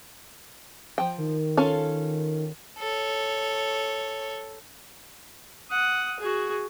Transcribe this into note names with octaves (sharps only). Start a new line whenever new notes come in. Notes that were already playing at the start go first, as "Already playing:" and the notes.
F3 G5
D#3
C#4 F4 A4
A4 C#5
F#5 D#6
F#4 G#4